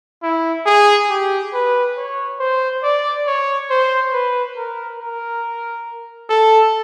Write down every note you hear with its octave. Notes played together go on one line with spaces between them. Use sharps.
E4
G#4
G4
B4
C#5
C5
D5
C#5
C5
B4
A#4
A#4
A4